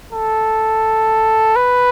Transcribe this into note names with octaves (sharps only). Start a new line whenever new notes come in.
A4
B4